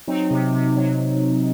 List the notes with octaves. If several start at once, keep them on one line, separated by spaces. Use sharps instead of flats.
F#3 C4 D#4
C3
C3
F#3